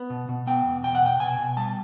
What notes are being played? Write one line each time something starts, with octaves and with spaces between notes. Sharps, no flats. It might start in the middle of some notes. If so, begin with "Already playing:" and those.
Already playing: B3
B2
B2
B3 G5
E2
B2 G5
F#5
B2 G5
B2 G#5
B2
G3 A5